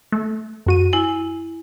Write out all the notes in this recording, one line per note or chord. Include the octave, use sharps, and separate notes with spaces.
A3
F#2 F#4 D#7
E4 G#5